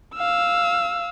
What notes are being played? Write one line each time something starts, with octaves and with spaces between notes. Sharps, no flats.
F5 E6